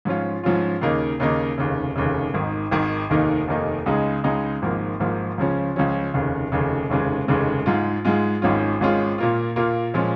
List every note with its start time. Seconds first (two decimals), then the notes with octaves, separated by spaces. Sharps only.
0.05 G#2 F3 C#4 F4
0.44 G#2 F3 C#4 F4
0.81 D#2 C#3 A#3 D#4
1.20 D#2 C#3 A#3 D#4
1.58 F1 D#2 C#3
1.96 F1 D#2 C#3
2.34 G#1 G#2 D#3
2.71 G#1 G#2 D#3
3.10 F1 D#2 D#3 A#3 D#4
3.48 F1 D#2 D#3 A#3 D#4
3.86 C#2 C#3 G#3 D#4
4.24 C#2 C#3 G#3 D#4
4.62 G#1 G#2 F3 A#3
5.00 G#1 G#2 F3 A#3
5.38 C#2 C#3 F3 C#4
5.76 C#2 C#3 F3 C#4
6.14 F1 D#2 C#3
6.52 F1 D#2 C#3
6.90 F1 D#2 C#3 G#3
7.28 F1 D#2 C#3 G#3
7.66 G#2 G#3 F4
8.05 G#2 G#3 F4
8.42 G#1 G#2 G#3 C#4 F4
8.81 G#1 G#2 G#3 C#4 F4
9.18 A#2 A#3 F4
9.56 A#2 A#3 F4
9.94 A#2 F3 G#3 C#4